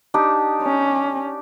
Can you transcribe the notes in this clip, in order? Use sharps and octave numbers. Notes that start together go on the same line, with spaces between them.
D4 D#4 G4
C#4